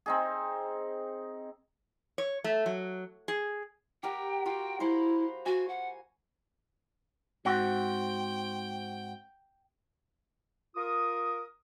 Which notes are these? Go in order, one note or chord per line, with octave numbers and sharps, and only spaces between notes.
C4 D#4 G#4
C#5
A3
F#3
G#4
G4 A#4 F#5 G5
F4 F#4 G5
E4 C5 A#5 B5
F#4 G#5
F#5
G#2 C4 F#4 G5
F4 A#4 D#6